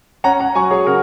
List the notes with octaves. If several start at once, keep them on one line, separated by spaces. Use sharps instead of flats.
C#4 F#5 A#5
F#5 A#5
F#3 G#5 C#6
G#4 C#5
C#3 F#4 A#4